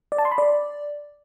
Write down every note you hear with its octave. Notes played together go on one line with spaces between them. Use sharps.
D5
A5
C6
B5
D5